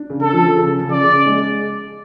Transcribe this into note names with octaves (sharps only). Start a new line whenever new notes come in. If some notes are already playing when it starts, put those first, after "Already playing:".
Already playing: D4
C#3
A4
F3
C#3
C#3
D5
C#3
G#3